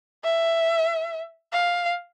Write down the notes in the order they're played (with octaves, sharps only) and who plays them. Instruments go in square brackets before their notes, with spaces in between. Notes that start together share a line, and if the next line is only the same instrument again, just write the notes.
[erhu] E5
F5